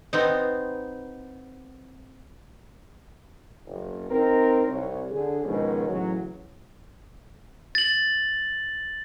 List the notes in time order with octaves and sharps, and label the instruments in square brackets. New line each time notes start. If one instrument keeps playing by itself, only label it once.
[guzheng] B3 C4 D#4
[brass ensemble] F#1
C4 D#4 A#4
C2 C#5
D3 G#4
G#2 B2 D#3 F3 G#3 C#4
A2 C#3 E3 F#3
[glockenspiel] A6 F#7